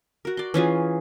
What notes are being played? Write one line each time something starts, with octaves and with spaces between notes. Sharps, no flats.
F#4 A#4
D5 C6
E3 C#4 F4 G#4